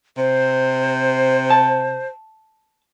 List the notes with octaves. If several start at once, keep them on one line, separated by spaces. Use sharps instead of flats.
C3 C5
A5